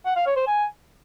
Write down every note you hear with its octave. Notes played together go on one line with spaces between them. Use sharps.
F#5
F5
C#5
C5
G#5